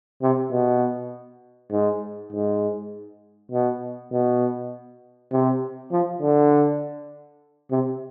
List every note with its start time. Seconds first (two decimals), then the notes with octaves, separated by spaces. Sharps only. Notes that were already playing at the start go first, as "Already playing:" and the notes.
0.22 C3
0.52 B2
1.71 G#2
2.33 G#2
3.51 B2
4.12 B2
5.32 C3
5.91 F3
6.22 D3
7.71 C3